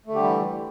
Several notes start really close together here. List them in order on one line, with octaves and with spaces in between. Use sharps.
A3 D3 G4 G3 E3